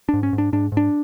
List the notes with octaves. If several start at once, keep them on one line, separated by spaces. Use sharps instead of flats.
G#2 D4
C#4
G#2
D4
G#2 D4
G#2
D4